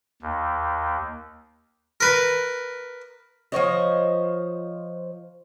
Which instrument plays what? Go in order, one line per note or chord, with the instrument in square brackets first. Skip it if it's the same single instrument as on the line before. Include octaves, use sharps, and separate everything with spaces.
[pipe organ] D#2
[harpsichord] A#4 B4
[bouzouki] F3 C5 C#5 D#5